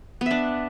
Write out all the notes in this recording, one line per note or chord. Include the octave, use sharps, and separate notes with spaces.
B3 D4 E5